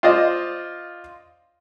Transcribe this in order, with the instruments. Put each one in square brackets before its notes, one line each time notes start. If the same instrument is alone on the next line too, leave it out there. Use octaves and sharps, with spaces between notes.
[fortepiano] F4 C5 D5 D#5